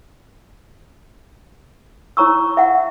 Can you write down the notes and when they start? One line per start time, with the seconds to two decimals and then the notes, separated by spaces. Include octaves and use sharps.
2.17 E4 C#5 A#5 C#6 E6
2.57 E5 F#5